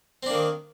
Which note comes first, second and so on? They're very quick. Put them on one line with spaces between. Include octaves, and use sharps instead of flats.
C4 D4 A#3 D#3